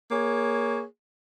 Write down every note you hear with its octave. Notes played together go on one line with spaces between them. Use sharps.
A#3 G#4 C#5